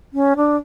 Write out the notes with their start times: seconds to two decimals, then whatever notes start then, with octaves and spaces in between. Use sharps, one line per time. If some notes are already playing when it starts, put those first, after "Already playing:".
0.14 C#4
0.36 D4